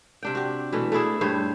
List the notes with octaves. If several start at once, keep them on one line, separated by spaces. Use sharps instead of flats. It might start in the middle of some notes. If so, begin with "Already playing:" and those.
C3 D4 G5
F#4 G4
B2 E3 A3
A3 D4 E4 G#4
G2 A3 C5 C#5